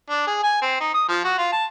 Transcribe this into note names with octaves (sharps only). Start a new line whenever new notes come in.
D4
G#4
G#5
C4
D#4
D#6
F3
F#4
F4
A5